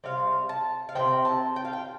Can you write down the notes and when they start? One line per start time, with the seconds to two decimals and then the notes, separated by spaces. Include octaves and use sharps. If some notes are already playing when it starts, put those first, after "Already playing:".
0.04 C3 G3 C4 F5
0.49 A5
0.89 F5
0.95 C3 G3 C4 G5
1.25 A5
1.56 G5
1.65 F5
1.73 G5